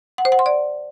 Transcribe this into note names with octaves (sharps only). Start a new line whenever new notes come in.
F#5
C5
F#5
C6
D5